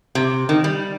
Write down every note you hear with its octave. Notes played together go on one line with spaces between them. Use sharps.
C3
D#3
G3